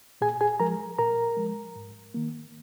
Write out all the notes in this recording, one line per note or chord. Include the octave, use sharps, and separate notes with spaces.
A#2 G#4 G#5
G#4 G#5
F3 G#3 A#4 A#5
A#2 A#4 A#5
F3 G#3
G#2
D#3 A#3